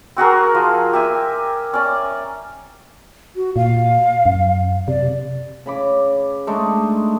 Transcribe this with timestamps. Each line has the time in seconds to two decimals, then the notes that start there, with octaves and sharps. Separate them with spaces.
0.17 C4 F#4 G#4 A#4
0.55 F3
0.93 G4 E5 G#5
1.73 C#4 D5
3.36 F#4
3.56 A#2 F5
4.26 F#2
4.88 C3 D5
5.66 C#3 B5 D6
6.47 G#3 A3 D4 D#4